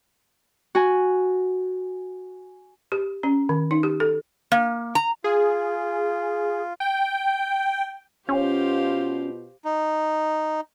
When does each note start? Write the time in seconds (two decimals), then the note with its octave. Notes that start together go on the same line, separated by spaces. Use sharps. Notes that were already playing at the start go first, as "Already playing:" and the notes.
0.75 F#4 G#5
2.92 G4
3.23 C#4
3.49 D#3
3.71 D#4
3.83 G4
4.00 A4
4.52 A#3
4.95 A#5
5.24 F4 G#4
6.80 G5
8.29 B2 C#4 F4 G4 C5 F5
9.65 D#4